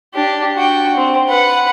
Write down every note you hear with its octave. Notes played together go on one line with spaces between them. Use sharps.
D4 G4
F#4 G5
C4
B4 F#5